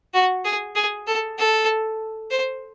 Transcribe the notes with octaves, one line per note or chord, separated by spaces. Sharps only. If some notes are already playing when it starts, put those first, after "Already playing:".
F#4
G#4
G#4
A4
A4
C5